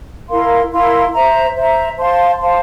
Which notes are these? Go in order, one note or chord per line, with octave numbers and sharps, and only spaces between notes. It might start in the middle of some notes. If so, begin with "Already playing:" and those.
E4 A#4 F5 C6
E4 A#4 F5 C6
C5 E5 A#5
C5 E5 A#5
C5 F5 A5 C6
C5 F5 A5 C6